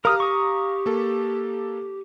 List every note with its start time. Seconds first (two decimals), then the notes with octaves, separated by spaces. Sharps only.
0.05 G4 A#4 F5 A#5 D#6 F6
0.20 C#6 D#6
0.86 A#3 A4